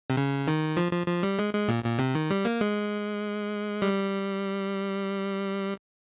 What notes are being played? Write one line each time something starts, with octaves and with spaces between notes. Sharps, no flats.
C3
C#3
D#3
F3
F3
F3
G3
G#3
G#3
A#2
A#2
C3
D#3
G3
A#3
G#3
G3